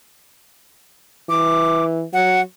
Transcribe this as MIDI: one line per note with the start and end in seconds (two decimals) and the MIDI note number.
1.29 2.04 52
1.29 1.85 86
2.13 2.41 54
2.13 2.41 78